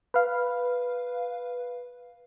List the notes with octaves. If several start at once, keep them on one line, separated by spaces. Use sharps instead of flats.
B4 F5